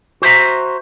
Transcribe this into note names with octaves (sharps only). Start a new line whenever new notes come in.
F#4 C5 E5 A#5